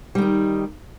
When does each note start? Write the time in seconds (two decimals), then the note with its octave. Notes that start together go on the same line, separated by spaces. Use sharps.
0.15 G3
0.18 D#3
0.22 D#4